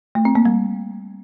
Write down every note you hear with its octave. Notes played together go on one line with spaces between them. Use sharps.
A3
C4
A#3
G3